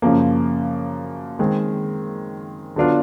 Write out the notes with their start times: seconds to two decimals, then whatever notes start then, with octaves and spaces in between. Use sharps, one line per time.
0.02 F#2 C#3 F3 A#3
1.39 D#3 G#3 C4
2.76 D3 F#3 B3 D4 F4